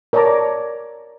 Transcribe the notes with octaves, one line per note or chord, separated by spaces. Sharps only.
A#4 C#5 D5 A5 A#5 D6